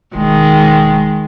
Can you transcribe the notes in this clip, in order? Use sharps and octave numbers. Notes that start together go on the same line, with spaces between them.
E1 D#3 G#3